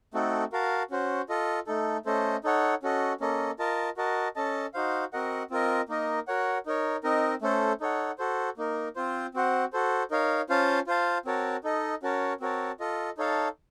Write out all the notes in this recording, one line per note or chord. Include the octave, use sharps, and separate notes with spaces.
A3 C4 D#4 F#4 A4
F#4 A#4 F5 A5
C#4 F#4 C5
F4 A4 D#5
A3 D#4 A4
A3 C#4 A4 C5 D#5
D#4 A4 C#5 F#5
C#4 F#4 A4 D#5
A#3 C#4 A4 D#5
F4 A#4 D#5 A5
F#4 A#4 D#5 A5
C#4 A4 D#5 A5
D#4 F#4 C5 F5
C4 F#4 A#4 D#5 F#5
C4 F4 A#4 D#5
A#3 D#4 A#4 D#5
F#4 A#4 C#5 F#5
D#4 A#4 C#5
C4 D#4 A#4 D#5
A3 C#4 A4 C5
D#4 A4 C#5 F#5
F#4 A4 C5
A#3 D#4 A#4
C4 F4 C5
C4 F#4 C5 F#5
F#4 A4 C5
D#4 A#4 C#5 F5
C#4 F4 C5 F5 A5
F4 C5 F5 A5
C4 F#4 A#4 C#5 A5
D#4 A4 D#5
C#4 F#4 A#4 C#5 A5
C4 F#4 A#4 C#5 A5
F4 A4 D#5
D#4 A4 C#5 F5 A5